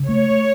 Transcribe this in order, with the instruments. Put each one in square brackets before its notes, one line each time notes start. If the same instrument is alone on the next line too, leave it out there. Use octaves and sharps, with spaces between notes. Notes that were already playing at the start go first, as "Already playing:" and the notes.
Already playing: [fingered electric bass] C#3
[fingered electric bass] A3 [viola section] C#5